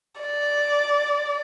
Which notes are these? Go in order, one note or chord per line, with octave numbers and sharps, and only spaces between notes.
D5